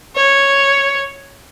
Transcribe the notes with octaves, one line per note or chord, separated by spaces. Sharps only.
C#5